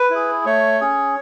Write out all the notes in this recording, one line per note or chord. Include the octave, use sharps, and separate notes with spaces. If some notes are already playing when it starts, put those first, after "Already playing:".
Already playing: B4
E4 G#4
A3 C#5
C#4 G#4